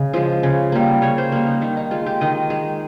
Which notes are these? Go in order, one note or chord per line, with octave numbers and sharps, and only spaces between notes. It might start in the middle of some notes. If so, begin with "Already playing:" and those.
Already playing: C#3 D#5
F3 G#3
C#3
G3 A#3
C#3 C#5
C5
G3 A#3 A#4
D#4
D#3 D#4
D#4
G#3 F4
G4
D#3 D#5
G#3